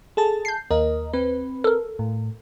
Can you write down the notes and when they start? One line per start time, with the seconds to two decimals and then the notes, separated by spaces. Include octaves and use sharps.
0.17 G#4 A4 A5
0.45 G6 C7
0.71 D#2 A#4 D#5
1.13 C4 B4
1.64 A4 A#4
1.99 A2